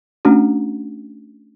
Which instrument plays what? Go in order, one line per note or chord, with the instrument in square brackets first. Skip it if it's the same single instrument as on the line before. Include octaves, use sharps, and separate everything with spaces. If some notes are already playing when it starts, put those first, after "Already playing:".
[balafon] A3 C#4 D4 F#4